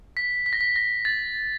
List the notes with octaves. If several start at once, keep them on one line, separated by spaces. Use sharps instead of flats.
B6
B6
A#6
B6
A#6
A6